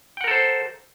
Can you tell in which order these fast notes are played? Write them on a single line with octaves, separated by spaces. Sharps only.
G5 F#5 A#4 A4 C5